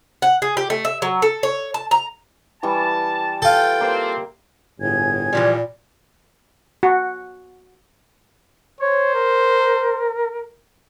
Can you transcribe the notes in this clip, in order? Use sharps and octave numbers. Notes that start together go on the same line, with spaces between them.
F#5
G#4
G4
A3
E5
F#3
A4
C#5
A5
A#5
E3 G3 A5 C#6
F4 A4 G5
A#3 C4 G4 C5
G1 A2 G#4 G#5 G#6
A#2 E3 F3 G3
F#4
C5 C#5
A#4